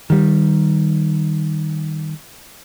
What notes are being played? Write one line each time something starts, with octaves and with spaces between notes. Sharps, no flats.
D#3 G3